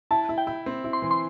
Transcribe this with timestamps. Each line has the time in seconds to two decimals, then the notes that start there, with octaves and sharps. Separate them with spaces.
0.11 E4 A5
0.29 E4
0.38 G5
0.47 E4
0.66 C4
0.84 E4
0.93 C6
1.02 E3
1.11 C6